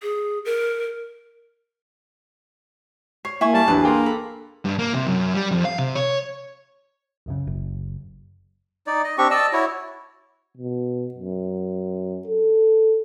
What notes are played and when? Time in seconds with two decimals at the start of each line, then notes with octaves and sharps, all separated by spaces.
0.02 G#4
0.45 A#4
3.25 C#5 C7
3.41 A#3 E4 G#5 C#6
3.54 G3 A5
3.68 A1 E2 D4 B4
3.83 A#3 G#4 G5 C6
4.06 A4 B5
4.65 G2
4.79 A#3
4.94 C3
5.07 F#2
5.34 G3
5.51 F2
5.65 F5
5.78 C3
5.95 C#5
7.26 C2 F#2 C#3
7.47 F#1
8.87 D#4 D5
9.04 D#5
9.18 C4 D4 G4 C#6
9.31 D5 D#5 A5 E6
9.53 E4 F#4 C#5
10.57 B2
11.14 F#2
12.28 A4